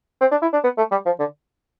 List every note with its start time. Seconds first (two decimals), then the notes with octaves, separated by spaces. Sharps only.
0.21 C4
0.31 D4
0.42 E4
0.53 D4
0.64 B3
0.77 A3
0.91 G3
1.05 F3
1.19 D3